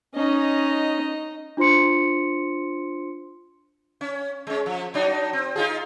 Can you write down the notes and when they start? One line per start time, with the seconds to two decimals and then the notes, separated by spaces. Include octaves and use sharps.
0.15 C#4 D#4 D#5
1.57 D4 F4 C5 C6 C#7
4.01 C#4
4.47 G#3 C#4
4.66 F3
4.94 F#3 D4 D#4
5.33 C4
5.56 D#4 F4 G#4